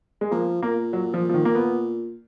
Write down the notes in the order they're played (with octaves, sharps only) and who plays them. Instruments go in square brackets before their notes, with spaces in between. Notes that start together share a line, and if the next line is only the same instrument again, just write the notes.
[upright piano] G#3
[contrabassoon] F3 [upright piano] A#3
[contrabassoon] A#2 [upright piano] A#3
[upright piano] F#3
F3
F3
D#3
A#3
B3